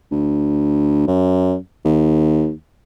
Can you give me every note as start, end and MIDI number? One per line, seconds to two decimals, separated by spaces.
0.11 1.03 38
1.07 1.56 42
1.85 2.51 39